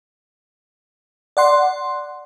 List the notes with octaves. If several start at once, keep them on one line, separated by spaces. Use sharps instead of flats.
D5 F#5 C6